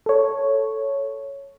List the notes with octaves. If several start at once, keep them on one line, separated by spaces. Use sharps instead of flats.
A4 C#5